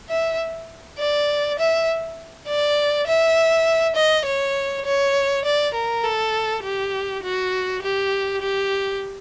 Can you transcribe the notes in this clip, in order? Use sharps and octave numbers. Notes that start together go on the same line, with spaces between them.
E5
D5
E5
D5
E5
D#5
C#5
C#5
D5
A#4
A4
G4
F#4
G4
G4